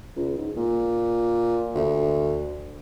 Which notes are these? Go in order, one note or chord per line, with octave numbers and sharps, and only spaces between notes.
C#2
G#2
A#2
D2